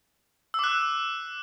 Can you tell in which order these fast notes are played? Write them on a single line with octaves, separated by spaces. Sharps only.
E6 D6 F#6